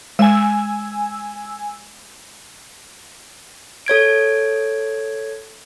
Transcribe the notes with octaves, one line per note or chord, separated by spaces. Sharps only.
G#3 G#5 E6
A4 C#5 G#6 D7